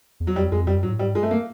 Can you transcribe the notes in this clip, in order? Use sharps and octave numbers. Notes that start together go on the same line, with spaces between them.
E2
F#3
F2 G3
F2 G#3
F#2 G3
G#2 F#3
A2
G#2 G3
G2 G#3
A3
A#3